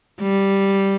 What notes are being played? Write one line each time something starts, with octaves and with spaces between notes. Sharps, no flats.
G3